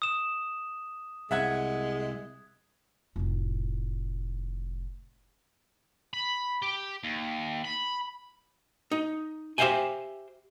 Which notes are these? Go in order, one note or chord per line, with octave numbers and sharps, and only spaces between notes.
D#6 E7
C2 G#3 E5 F#5 G#6
F1 A2
B5
G4
D#2
B5
D#4
G4 C5 E5 F5 G5 G#5